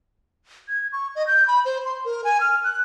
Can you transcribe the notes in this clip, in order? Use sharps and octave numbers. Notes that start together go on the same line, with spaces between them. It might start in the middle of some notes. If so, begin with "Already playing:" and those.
G#6
C#6
D#5
G6
B5
C5
C6
A#4
G#5
F6
F#6